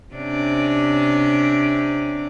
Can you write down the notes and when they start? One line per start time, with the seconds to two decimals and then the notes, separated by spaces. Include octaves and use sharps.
0.14 C3 C#4 D4